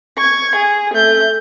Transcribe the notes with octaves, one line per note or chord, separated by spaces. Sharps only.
C#6 G#6
G#4
A3 G6